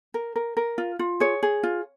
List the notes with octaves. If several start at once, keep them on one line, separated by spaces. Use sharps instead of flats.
A#4
A#4
A#4
F4
F4
G#4 C#5
G#4
F4